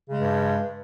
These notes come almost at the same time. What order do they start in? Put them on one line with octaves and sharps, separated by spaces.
C#3 G#3 G2